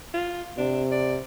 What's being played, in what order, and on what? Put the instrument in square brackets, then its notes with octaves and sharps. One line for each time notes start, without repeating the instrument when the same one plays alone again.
[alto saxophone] F4
[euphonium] C3 [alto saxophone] D4
[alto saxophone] D5